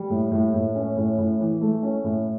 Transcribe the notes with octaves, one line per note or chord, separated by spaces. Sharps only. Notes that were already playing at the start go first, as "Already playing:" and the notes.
Already playing: G3
A2
A2
A2
C#4
A2
A2
E3
A3
C#4
A2